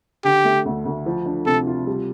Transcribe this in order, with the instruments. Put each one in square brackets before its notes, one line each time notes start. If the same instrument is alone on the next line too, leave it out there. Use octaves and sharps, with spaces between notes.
[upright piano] D3 [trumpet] G4
[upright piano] A3
D2
D2
F3
D4
[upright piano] C3 [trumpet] A4
[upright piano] F4
G3